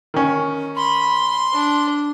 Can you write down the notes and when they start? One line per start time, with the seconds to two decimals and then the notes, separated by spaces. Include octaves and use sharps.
0.14 D#3 C#4
0.76 B5 C6
1.53 D4